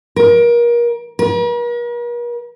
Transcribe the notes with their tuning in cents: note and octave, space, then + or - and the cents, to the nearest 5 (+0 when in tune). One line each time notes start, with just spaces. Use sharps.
A#4 +30
A#4 +45